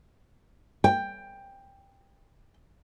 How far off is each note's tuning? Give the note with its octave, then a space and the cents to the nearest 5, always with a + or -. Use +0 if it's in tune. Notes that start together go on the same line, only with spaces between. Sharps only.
G5 +10